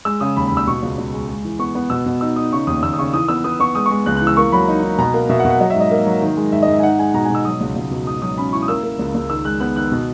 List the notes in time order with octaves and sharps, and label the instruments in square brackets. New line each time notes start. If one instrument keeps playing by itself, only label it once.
[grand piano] G#3 E6
C#3 D#6
D#2 B5
B5
D#2
E6
B2 C#6
C#2
C#2
G#3
G#3
E3
B3 C#6
B3
B2 E6
B2
D#4 E6
D#4 D#6
C#3 C#6
D#2 D#6
D#2 E6
D#6
C#3 C#6
E3 D#6
B3 E6
B3 D#6
B3 C#6
G#3 D#6
C#6
G#3
C#2 F#6
F#6
E3
E6
A#3 C#6
F#3 B5
D#4
D#4
B2 A#5
A#3
B2 E5
F#5
B2
F#5
F#3 D#5
E5
G#2
D#5
A#3
F#3
D#3
G#3
G#2 E5
D#5
G#2
E5
G#5
D#4 F#5
G#3 G#5
B2 A#5
G#5
B2
E6
F#3 D#6
C#2
C#2
B2
G#2 D#6
F#3 D#6
C#4 B5
E4 C#6
D#6
A#3 E6
A#3
C#2
C#2
D#3 E6
G#3 F#6
B3 F#6
D#3 F#6
B2